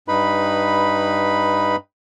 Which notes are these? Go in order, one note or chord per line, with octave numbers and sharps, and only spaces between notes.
G2 D#4 B4 B5